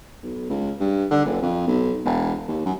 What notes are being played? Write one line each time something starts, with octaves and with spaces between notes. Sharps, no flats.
B1
C#2
G2
D3
F#1
F2
B1
E1
D#2
F#2